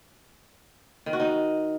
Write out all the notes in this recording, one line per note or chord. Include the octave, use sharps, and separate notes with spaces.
D#3
F#4
D#4